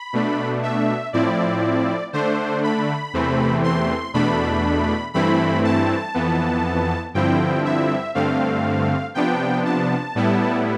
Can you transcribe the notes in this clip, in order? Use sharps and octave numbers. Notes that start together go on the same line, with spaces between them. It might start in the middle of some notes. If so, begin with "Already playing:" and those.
Already playing: B5
B2 A3 D4
E5
A2 F3 C4 E4 D5
D3 A3 D4 C5
B5
E2 C3 E3 A3 C4
C6
E2 B2 A3 D4 B5
G2 E3 A3 C4 E4 B5
A5
F2 E3 B3
G2 D3 F3 C4 E4 G5
E5
G2 D3 A3 C4 F5
C3 F3 B3 D4 G5
A5
A2 G3 B3 E4